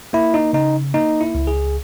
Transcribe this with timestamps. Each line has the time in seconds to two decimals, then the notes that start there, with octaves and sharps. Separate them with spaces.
0.13 A#3 E4
0.34 D#4
0.53 C#3 D#4
0.94 A#3 D#4
1.21 E4
1.35 C#2
1.47 G#4